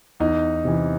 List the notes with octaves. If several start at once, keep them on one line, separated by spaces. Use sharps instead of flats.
E2 D#4
C3 E3